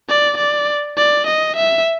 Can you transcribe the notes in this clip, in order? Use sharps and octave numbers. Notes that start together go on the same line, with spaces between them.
D5
D5
D5
D#5
E5